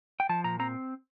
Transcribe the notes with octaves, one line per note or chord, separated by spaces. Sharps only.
G5
F3 A5
A#2 A#5
C4 A#5